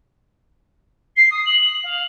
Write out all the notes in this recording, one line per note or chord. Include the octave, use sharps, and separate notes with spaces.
C7
D#6
F#7
F5